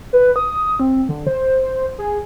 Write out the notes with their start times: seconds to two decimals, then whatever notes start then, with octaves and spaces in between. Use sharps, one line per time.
0.13 B4
0.36 D#6
0.80 C4
1.09 D3
1.27 C5
1.98 G#4